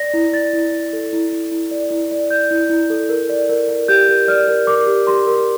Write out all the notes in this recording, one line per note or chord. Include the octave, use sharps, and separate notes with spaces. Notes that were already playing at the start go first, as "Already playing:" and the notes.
Already playing: D5 A#6
E4
D5 A6
E4
D5
A4
E4
E4
E4
D5
E4
D5
D5 G6
E4
E4
A4
A#4
D5
A#4
A#4
G4 G6
A#4
D5 F6
A#4
A#4 D6
G4
G4 C6
A#4